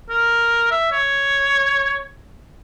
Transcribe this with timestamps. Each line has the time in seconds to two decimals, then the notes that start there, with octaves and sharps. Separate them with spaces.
0.10 A#4
0.71 E5
0.92 C#5